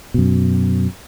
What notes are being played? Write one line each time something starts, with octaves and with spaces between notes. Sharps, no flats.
F#2 B2